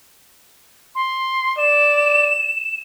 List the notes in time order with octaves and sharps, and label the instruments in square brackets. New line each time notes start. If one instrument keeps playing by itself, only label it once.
[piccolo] C6
[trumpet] D5 [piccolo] E7